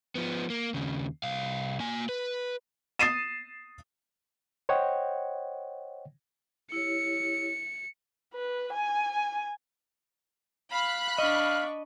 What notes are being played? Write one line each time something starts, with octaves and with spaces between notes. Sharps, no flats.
F3 B3
A#3
D#2 C#3
C2 F5
A#3 G#5
B4
D#6 A6 C7 D#7 E7
C5 C#5 D#5 F#5 G5
E4 G4 C#5 C#7
B4
G#5
F5 B5 F#6
D4 D#5 F5 C#6